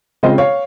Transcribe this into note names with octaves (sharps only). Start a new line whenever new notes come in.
C#3 G#3 C4 F4 C5 D#5
C#5 F5